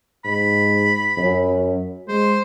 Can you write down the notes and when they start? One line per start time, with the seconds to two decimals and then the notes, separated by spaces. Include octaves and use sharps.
0.25 G#2 B5
1.17 F#2
2.08 G#3 C5